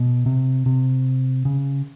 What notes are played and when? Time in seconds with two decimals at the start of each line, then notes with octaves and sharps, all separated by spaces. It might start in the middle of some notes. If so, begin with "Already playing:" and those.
Already playing: B2
0.26 C3
0.66 C3
1.45 C#3